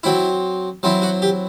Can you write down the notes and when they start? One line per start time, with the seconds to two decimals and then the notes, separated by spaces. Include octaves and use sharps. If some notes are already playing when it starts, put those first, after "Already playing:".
0.03 F#3 C4 E4
0.83 F#3 C4 E4
1.02 F#4
1.22 G4